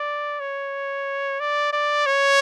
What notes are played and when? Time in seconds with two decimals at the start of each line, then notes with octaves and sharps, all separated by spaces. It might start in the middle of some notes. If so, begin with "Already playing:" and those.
Already playing: D5
0.40 C#5
1.40 D5
1.73 D5
2.06 C#5